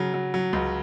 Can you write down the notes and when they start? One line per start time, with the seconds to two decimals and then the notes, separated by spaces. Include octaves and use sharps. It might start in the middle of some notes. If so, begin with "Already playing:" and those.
Already playing: C#3 F#3
0.14 F#3
0.34 F#3
0.53 C#2